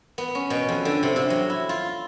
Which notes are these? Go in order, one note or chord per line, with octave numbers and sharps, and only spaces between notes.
B3
C#4
B2
F2
D3
C3
C3
F#3
E4
F4